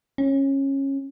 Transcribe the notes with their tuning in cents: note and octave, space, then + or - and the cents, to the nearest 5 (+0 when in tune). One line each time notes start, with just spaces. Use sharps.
C#4 -20